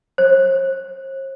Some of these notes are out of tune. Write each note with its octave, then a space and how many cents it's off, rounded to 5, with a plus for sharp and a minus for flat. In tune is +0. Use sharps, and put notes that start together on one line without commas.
C5 +45